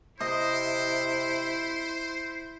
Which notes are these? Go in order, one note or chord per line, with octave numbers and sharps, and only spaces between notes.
C3 E4 C5 D#5